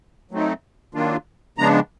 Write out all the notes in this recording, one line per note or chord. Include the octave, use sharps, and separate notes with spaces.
F#3 A3 C4 D#4
D#3 F#3 A#3 D4 F4
C#3 F3 G#3 B3 D4 A#5